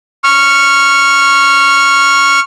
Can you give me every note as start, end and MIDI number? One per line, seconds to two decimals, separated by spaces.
0.24 2.40 85
0.24 2.40 89